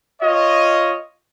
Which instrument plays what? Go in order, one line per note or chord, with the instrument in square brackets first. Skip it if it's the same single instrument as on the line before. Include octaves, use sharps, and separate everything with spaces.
[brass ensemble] F4 C#5 D#5